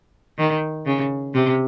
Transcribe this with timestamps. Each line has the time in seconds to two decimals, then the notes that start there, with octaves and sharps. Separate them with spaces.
0.38 D#3
0.86 C#3
1.34 C3